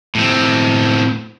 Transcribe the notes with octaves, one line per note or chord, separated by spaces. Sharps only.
A2 C4